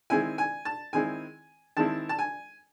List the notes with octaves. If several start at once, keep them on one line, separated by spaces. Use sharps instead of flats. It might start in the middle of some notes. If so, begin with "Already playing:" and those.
D#3 G#3 C4 E4 G#5
G#5
A5
D#3 G#3 C4 E4 G#5
D#3 G#3 C4 E4 A5
A5
G#5